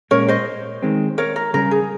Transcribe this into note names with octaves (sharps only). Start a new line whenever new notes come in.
A#2 G#3 C#4 A#4 C#5
C5 D#5
D#3 G#3 C4
A#4 C#5
A#4
C#3 G3 C#4 A#4
G#4